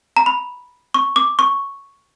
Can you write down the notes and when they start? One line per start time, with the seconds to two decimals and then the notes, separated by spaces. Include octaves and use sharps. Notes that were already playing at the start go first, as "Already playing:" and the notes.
0.17 A#5
0.26 B5
0.94 C#6
1.16 D6
1.39 C#6